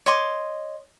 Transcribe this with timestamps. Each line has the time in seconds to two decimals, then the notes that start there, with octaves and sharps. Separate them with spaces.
0.06 C#5 D#5 C6 D6